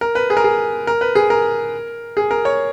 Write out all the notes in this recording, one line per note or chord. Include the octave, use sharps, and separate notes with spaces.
A#4
B4
G#4
A#4
G#4
A#4
B4
G#4
A#4
G#4
A#4
C#5